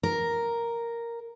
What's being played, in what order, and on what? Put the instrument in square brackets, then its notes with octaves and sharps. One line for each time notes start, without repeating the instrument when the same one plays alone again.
[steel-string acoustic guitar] A#4